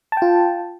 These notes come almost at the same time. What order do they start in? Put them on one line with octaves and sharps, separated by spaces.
A5 G5 F4